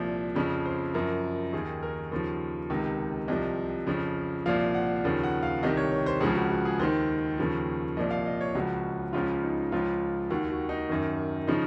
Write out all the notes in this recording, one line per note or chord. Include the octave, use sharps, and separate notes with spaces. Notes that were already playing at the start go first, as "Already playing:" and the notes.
Already playing: C2 A#2 F3
F2 C#3 F3
C5
F#2 F3 A#4
D#2 D#3 G#4
A#4
D#2 C#3 F3
C#2 C3 D#3
C2 C3 F3 D#5
F2 C#3 F3
C2 A#2 F3 F5
F#5
D#2 C#3 F3
F#5
F5
C2 C3 D#3 D#5
C#5
C#5
C5
C#2 C#3 F3 G#4
F#4
F#4
G#4
D#2 D#3 C5
D#2 C#3 F3
C2 A#2 F3 D#5
F5
D#5
C#5
C#2 C#3 F3 F#4
C#2 C#3 F3 F4
D#4
C#2 C#3 F3 F4
D#2 D#3 F#4
F#4
D#4
F#2 D#3
C#3 F3 D#4